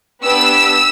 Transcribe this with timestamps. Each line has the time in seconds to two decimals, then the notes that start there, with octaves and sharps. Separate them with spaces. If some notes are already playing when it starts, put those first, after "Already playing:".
0.23 B3 D4 G4 E6